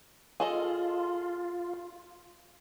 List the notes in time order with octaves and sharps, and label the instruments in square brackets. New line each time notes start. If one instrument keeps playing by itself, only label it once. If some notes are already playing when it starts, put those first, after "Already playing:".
[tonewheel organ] F4 [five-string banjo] G#4 A4 D#5